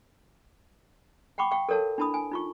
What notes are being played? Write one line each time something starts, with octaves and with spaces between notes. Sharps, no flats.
F#5 G5 B5 C#6 D6
F5 G5 C#6
A4 A#4 C#5 F5 A5
D4 E4 A5 B5 D#6
G#5
D#4 F4 C#6